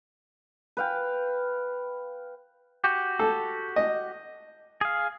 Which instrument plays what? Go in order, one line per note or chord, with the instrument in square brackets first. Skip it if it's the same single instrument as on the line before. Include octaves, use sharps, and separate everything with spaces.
[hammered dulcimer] B4 F5 G5
[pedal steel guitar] F#4 G4
[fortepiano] A4
D#5
[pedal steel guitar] G#4 F5